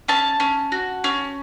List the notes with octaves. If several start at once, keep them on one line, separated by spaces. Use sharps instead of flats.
C#4 A5
C#4
F#4
C#4